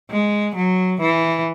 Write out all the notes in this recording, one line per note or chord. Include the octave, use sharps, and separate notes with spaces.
G#3
F#3
E3